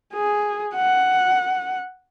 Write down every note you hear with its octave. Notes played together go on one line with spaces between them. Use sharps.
G#4
F#5